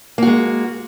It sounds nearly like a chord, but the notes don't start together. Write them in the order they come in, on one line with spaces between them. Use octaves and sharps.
A#3 F#4 G#3